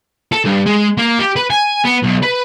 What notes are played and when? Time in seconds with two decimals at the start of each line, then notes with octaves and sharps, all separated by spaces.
0.32 A4
0.45 G2
0.66 G#3
0.98 A#3
1.19 G4
1.36 B4
1.50 G#5
1.84 B3
2.03 B1
2.22 B4